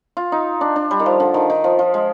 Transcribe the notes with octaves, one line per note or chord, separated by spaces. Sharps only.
F4
D#4
D4
D4
G3
D#3
F3
D3
D#3
D#3
F3
F3
G#3